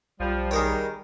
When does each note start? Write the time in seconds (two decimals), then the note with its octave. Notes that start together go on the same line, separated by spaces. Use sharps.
0.20 B1 F3 G3
0.51 D#3 G#4 A#4 C#5